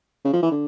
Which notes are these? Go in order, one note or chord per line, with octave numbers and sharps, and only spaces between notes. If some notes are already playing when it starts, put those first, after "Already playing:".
C#3
F3
E3
D3